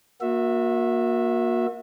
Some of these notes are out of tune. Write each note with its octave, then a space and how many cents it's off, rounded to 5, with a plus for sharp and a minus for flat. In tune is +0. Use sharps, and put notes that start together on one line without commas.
A#3 +20 F#4 -35 E5 +0